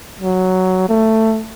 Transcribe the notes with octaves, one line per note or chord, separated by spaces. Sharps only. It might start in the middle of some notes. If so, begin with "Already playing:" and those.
F#3
A3